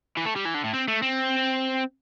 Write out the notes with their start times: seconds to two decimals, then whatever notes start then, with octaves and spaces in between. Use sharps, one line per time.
0.17 E3
0.26 A3
0.36 G3
0.45 E3
0.54 D3
0.64 A2
0.74 C4
0.88 A3
1.02 C4